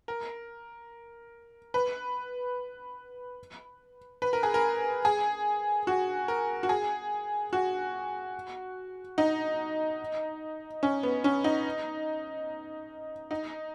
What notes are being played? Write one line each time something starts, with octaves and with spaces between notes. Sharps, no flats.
A#4
B4
B4
A#4
G#4
A#4
G#4
F#4
A#4
F#4
G#4
F#4
D#4
C#4
B3
C#4
D#4
D#4